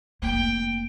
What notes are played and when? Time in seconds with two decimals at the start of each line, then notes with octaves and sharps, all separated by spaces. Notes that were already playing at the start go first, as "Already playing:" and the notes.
0.22 F1 A#3 G5